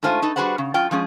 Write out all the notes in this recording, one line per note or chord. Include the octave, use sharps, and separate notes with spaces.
G#2 A3 F4 C5 G#5
D#4 A4 B4
G3 F#4 G#4 B4 C5 F#5
C#3
F#2 F4 G5
F3 G#3 C#4 G#4